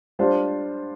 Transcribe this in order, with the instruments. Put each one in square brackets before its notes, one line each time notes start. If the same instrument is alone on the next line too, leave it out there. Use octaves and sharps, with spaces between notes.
[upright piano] G3 D4 F4 C5